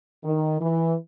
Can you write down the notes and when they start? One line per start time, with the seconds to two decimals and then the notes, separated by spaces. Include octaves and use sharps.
0.24 D#3
0.61 E3